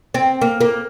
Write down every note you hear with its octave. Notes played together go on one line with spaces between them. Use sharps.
C4
A#3
A#3